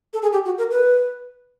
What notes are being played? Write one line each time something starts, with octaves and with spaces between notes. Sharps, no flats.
A4
G#4
G4
F#4
A#4
B4